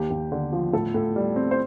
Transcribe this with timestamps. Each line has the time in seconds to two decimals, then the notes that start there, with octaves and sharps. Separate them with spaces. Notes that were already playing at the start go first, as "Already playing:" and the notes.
Already playing: D#2 G4
0.10 D#2
0.32 D3
0.53 F3
0.73 A2 A4
0.94 A2
1.16 G3
1.36 C4
1.51 C5